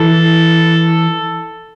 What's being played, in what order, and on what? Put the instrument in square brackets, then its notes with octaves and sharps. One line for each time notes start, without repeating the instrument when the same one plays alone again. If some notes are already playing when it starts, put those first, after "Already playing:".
Already playing: [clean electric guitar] E3 [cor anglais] A4